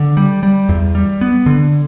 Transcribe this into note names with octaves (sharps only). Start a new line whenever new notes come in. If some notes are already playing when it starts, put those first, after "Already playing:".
Already playing: D3
G3
G3
E2
G3
B3
D3